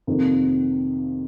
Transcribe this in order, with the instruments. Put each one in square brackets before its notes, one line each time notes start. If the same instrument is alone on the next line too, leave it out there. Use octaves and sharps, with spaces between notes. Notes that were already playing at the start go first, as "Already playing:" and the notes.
[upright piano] F2 C3 D#3 A#3